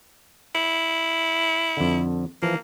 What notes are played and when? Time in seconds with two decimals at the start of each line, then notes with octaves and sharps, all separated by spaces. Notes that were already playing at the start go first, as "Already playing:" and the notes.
0.55 E4
1.77 F2 D3
2.43 E3 F3 A#3